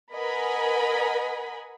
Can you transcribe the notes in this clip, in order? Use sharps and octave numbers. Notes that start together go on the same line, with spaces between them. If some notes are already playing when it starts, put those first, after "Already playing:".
A#4 B4 D#5 F#5 G#5 B5